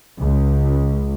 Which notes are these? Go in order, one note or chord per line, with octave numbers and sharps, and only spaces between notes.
C#2